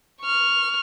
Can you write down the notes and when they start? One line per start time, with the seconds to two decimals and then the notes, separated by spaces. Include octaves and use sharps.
0.22 C#6 F6